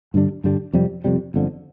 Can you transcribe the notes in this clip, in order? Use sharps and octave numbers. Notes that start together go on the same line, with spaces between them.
G2 D3 G3 D4
G2 D3 G3 D4
F2 C3 G3
F2 C3 G3
G1 F2 D3